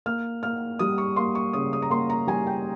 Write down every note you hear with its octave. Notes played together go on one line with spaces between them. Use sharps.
A#3 F6
A#3 F6
G3 D#6
C#6
A#3 C6
C#6
C#3 D#6
D#6
A#5
A#3 C6
A#5
G3 G#5
G5